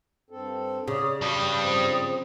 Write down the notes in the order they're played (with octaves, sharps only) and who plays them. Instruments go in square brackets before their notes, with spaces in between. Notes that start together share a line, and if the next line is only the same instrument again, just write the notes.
[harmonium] G2 C4 A4
[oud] C#3 [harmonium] C#5 D5 [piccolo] D#6
[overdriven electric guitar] G2 G3 [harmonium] F#4 [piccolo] D#6
[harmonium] F3 C4